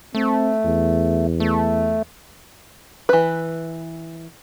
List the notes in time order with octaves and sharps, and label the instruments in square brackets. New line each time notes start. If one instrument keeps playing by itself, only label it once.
[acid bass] A3 [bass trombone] C4
[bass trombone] E2
[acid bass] A3
[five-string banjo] E3 B4